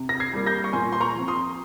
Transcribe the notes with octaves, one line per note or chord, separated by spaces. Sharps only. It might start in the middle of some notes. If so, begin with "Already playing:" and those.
Already playing: C3
A#6
G#6 C7
G3 A#3
G6 A#6
C#6
A#2 G#5 C6
C6
A#5 C#6
F3 C4
C6 D#6